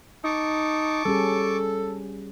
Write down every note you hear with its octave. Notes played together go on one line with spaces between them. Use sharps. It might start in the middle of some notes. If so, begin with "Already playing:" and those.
D#4 A5 C#6 D6
G3 C#4 G#4 A4